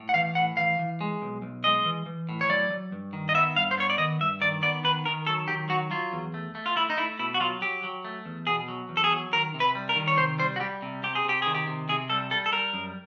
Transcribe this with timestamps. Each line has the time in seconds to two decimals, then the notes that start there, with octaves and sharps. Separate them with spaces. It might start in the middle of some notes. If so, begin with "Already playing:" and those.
Already playing: A2
0.09 F#5
0.14 E3 F5
0.35 A2 F#5
0.57 E3 F5
0.79 E3
1.01 G#3
1.22 B1
1.42 B1
1.64 G#3 D#5
1.85 E3
2.06 E3
2.29 A2
2.41 C#5
2.49 F#3 D5
2.70 F#3
2.92 G2
3.13 D#3
3.29 D#5
3.34 B3 E5
3.56 G2 F5
3.71 C5
3.77 B3 C#5
3.90 D5
3.98 D#3 D#5
4.21 G2 E5
4.41 D#3 D5
4.62 B3 D5
4.84 D#3 B4
5.06 D#3 A#4
5.27 F#3 A4
5.48 D#3 G4
5.69 F#3 F#4
5.91 F#3 F4
6.13 E2
6.34 A3
6.55 A3
6.66 F4
6.76 A3 E4
6.90 D#4
6.97 A3 E4
7.19 B2 E4
7.34 F#4
7.40 F#3 F4
7.61 F#3 G4
7.84 F#3
8.05 A3
8.25 E2
8.47 B2 G#4
8.68 F#3
8.89 E2
8.97 A4
9.04 G#4
9.11 F#3
9.33 D#3 A#4
9.54 C3
9.60 B4
9.75 G3
9.89 A#4
9.96 D#3
10.08 C#5
10.17 C3 C5
10.39 G3 C5
10.56 F#4
10.60 G3 G4
10.82 C3
11.03 C3 G4
11.15 G#4
11.25 C3 G4
11.42 D#3 G#4
11.55 G4
11.67 C3
11.89 C3 G#4
12.10 G3 A4
12.31 G3 A4
12.46 A4
12.52 G3 A#4
12.73 F#2